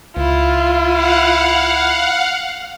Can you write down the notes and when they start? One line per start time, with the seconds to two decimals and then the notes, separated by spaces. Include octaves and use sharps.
0.17 C#2 E4 F4
0.91 F5 F#5